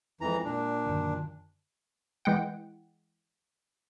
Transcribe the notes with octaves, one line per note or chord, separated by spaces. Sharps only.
F2 E3 G#3 E4 A#5
A#2 D4
F#2 D3 D#3
E3 G#3 F#5 G5